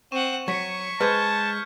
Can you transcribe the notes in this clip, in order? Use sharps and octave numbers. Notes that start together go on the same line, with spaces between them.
C4 F#5 C#6 D#7 E7
F#3 C#6 G#6 B6 C#7
G#3 B4 C5 A5 F6 G6 G#6